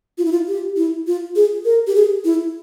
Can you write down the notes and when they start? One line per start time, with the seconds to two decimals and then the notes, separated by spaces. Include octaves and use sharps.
0.18 F4
0.25 E4
0.32 F4
0.48 G4
0.77 E4
1.07 F4
1.36 G#4
1.65 A#4
1.87 G4
1.95 G#4
2.25 E4